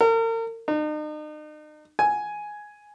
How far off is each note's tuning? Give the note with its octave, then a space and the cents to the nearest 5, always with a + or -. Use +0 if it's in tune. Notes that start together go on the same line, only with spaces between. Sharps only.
A#4 -40
D#4 -40
G#5 +5